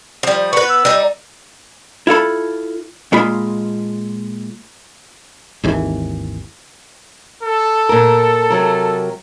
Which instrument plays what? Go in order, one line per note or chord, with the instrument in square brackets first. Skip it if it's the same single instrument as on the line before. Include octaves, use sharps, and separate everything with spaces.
[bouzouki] F3 G3
[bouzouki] B3 B4 [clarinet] C#6
[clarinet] E6
[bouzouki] G3 D#4
[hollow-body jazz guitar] E4 F4 A4 B5
A#2 G#3 F4 B5
[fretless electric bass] G#1 D#2 E3
[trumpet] A4
[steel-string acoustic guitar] A#2 A#4
C3 F#3 A#4